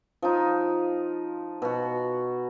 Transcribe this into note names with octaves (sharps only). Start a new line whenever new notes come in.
F3 D#4
B2 F#4